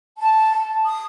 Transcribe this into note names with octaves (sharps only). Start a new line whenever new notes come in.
A5
D#6